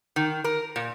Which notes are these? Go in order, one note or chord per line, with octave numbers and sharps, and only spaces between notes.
D#3
A#4
A#2